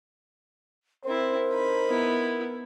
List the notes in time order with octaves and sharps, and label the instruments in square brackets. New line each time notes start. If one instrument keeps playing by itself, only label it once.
[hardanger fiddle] C4 E4 [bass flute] A#4 [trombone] C5
[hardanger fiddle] D#4 B5
[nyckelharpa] B3 E4